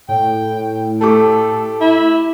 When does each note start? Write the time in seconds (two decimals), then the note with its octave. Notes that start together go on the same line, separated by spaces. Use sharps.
0.09 A2 G5
1.01 A3 G4 A4 D6
1.81 E4